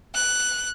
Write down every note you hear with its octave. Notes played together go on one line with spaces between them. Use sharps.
F#6